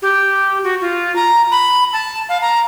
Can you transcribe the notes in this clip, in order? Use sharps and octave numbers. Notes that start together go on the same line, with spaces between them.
G4
F#4
F4
A#5
B5
A5
F5
A#5